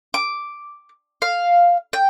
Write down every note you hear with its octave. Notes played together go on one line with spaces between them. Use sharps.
D6
F5
G5